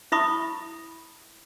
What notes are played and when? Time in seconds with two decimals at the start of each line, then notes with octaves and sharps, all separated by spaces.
0.12 E4 E5 B5 C#6 D#6